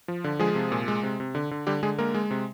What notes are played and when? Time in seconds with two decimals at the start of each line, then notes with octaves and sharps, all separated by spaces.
0.08 F3
0.24 D3
0.39 F3 G#3 G#4
0.55 C3
0.72 A#2
0.88 G#3
1.03 C3
1.20 C3
1.35 D3
1.51 D3
1.67 D3 G3 G4
1.83 D3 G#3 G#4
1.98 G#3 A#3 A#4
2.14 G#3
2.31 C3